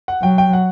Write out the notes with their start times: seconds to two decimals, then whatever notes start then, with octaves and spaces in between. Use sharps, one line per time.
0.08 F#5
0.22 F#3 G5
0.38 G5
0.53 F#5